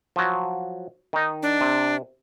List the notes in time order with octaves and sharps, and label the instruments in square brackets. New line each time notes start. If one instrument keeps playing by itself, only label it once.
[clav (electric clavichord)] F3 F#3
D#3 D#4
[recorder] D4
[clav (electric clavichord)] C3